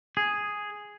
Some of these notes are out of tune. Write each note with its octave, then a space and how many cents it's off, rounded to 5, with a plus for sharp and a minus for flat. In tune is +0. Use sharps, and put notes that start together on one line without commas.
G#4 +0